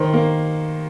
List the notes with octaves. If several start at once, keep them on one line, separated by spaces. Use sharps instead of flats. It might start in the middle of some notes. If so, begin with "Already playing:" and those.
Already playing: D#3 C5
A#3